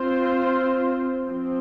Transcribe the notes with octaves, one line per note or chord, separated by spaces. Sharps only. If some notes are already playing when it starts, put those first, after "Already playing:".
Already playing: C4 F4 C5
F3 C4